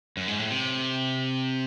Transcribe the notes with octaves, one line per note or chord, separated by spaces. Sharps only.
F#2
G#2
A2
C3